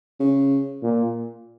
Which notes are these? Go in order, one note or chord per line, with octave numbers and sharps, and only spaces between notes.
C#3
A#2